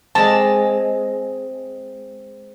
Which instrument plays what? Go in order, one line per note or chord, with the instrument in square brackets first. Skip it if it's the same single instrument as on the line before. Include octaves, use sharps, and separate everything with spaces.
[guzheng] G#3 C4 [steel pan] A5